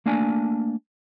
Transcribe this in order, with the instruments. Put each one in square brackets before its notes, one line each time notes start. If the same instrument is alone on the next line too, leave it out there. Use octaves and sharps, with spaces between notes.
[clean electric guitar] A3 A#3 D4 D5 G#5 A5